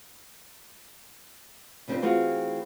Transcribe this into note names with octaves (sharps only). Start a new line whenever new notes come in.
C#3 F3 C4 D4 B4 C5
E3 A3 C4 F4 F#4 G#4